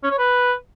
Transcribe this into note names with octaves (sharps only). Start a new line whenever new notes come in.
C#4
C#5
B4